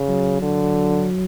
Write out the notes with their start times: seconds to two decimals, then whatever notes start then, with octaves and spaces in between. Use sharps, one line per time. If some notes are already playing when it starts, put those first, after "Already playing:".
Already playing: C#3
0.09 F#3
0.42 D3